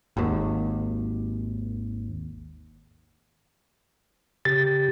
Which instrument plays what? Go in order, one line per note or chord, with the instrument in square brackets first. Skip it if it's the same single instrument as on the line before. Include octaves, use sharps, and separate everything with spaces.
[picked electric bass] G#1 D#2
[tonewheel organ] C#3 G4 [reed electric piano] A6